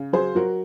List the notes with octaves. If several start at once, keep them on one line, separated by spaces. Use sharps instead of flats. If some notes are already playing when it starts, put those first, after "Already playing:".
Already playing: C#3
F#3 G#4 C5
F#3 F#4 A#4